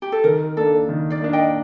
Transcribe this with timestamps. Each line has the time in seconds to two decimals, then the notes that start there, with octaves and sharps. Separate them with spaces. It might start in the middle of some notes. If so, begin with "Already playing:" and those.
0.02 G4
0.12 A4
0.24 D#3 A#4
0.57 A#3 D4 A4
0.89 D#3
1.10 D5 F5
1.22 A#3 D4
1.33 D#5 G5